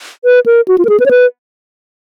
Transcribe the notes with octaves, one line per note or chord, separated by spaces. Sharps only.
B4
A#4
F#4
F4
A#4
G#4
B4
C#5
B4